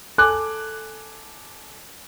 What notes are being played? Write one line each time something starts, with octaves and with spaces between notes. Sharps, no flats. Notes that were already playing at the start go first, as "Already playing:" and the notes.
A4 G#5 D6 F#6